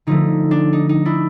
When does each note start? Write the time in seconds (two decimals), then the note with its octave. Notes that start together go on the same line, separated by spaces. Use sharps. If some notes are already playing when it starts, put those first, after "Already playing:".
0.07 D3 F3 A3 D#4
0.51 D4
0.73 D#4
0.89 D#4
1.05 D4 E4